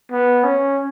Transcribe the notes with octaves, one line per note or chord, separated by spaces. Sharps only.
B3
C#4